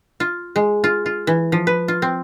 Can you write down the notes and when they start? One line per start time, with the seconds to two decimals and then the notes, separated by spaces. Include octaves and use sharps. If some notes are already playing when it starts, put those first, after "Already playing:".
0.20 F4
0.56 G#3
0.84 F4
1.06 F4
1.27 E3
1.52 F3
1.67 B4
1.88 F4
2.02 C4